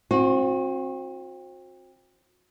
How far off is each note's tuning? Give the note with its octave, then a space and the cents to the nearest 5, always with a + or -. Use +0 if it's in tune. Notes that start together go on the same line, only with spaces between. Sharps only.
C4 +25 F#4 -30